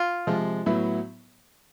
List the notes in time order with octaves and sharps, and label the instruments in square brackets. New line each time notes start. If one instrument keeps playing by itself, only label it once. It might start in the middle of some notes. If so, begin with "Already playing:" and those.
Already playing: [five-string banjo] F4
[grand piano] C3 F3 G#3
A2 F#3 B3 E4